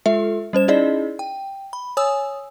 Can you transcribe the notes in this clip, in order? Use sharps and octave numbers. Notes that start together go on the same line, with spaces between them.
G#3 F4 A4 E5
G3 C#4 C5 E7
C#4 D#4 E4 G#4 D5 D#5
G5
B5
C#5 G#5 D#6 E6